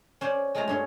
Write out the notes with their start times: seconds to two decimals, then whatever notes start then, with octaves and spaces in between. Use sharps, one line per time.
0.21 C#4 C5 D5
0.55 G#3 A3 F4 G#4 A#5
0.68 G2 C#4 C6